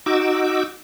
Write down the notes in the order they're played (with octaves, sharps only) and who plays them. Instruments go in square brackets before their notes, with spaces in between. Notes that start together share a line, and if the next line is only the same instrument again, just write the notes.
[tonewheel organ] D#4 F#4 D6 E6